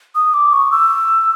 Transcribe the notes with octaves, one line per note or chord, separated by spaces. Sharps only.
D#6
D6
C#6
E6